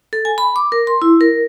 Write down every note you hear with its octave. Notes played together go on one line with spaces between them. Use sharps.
A4
G#5
B5
D6
A#4
C6
E4
A#4